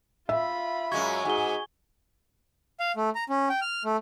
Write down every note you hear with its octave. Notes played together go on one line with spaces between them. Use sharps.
F4 E5 B5
F#2 G#3 F#4 C#6 G#6
G#2 F#4 G#4 G#5 G7
F5
A3
A#5
C#4
G5
F6
A3